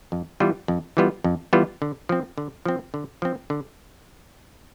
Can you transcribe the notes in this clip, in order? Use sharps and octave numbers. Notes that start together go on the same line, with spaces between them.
F2
E3 G3 B3 F4
F2
E3 G3 B3 F4
F2
E3 G3 B3 F4
D3
F3 C4
D3
F3 C4
D3
F3 C4
D3